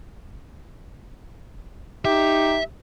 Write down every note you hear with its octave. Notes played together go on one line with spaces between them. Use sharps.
D#4 G4 E5